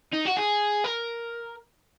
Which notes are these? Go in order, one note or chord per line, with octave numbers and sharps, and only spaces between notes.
D#4
F#4
G#4
A#4